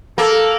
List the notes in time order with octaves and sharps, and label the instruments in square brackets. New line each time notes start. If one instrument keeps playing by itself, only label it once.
[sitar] A#3 [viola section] A4